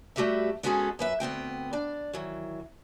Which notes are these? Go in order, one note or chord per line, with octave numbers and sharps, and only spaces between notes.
G3 A3 F#4 G4 B4 E5
G#3 B3 C#4 F#4 G#4 A4
F#2 B4 E5
D2 B3 C4 G5
D4 D5
D#3 E3 F#3